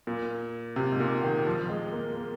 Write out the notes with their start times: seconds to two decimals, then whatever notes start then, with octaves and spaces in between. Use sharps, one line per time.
0.07 A#2
0.76 C3
0.92 G#2
1.00 A#2
1.23 D#3
1.47 F3
1.69 G#3
1.92 A#3
2.16 A#3